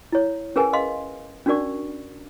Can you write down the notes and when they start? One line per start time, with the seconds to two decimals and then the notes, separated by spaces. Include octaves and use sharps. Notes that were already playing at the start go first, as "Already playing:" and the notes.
0.12 E4 C#5
0.56 C#4 G#4 A#4 B4 F#5 G#5
0.73 D#5 F5 C6
1.46 C#4 D4 F#4 A#4 D5 C#6